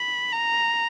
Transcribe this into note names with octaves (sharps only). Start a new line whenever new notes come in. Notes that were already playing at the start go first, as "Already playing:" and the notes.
Already playing: B5
A#5